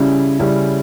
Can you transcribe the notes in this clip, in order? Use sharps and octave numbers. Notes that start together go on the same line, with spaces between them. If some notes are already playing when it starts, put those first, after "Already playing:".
Already playing: C#3 G3 C#4 E4
C#3 G3 C#4 E4